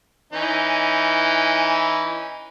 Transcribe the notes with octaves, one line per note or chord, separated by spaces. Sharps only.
E3 C#4 D#4